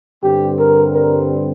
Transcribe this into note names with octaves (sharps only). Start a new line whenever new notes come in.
G2 D3 G3 C4 G4
A#4
A#4